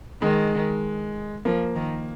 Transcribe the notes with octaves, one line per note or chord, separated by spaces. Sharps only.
D#3 G#3
F3 A#3
D#3